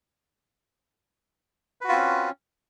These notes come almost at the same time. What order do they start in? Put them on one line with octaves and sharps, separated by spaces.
B4 F#4 F4 C4 C#4